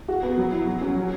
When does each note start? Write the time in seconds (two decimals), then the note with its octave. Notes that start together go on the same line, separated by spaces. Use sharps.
0.08 F#4
0.23 B3
0.38 F#3
0.52 E4
0.67 F#3
0.81 C#4
0.96 F#3